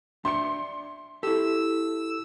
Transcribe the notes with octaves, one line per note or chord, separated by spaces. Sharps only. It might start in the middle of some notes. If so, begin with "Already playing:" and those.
D4 E5 G5 C6 C#7
E4 G4 A4 E6